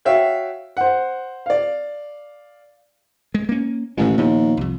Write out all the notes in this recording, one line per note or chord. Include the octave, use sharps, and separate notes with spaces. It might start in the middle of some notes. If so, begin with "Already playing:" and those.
F#4 C#5 E5 F5 G5
C5 F#5
D5 F5
G#3
A#3 C#4
A1 A2 D#3 G#3
D#2 A#2 F3 B3
C2 F2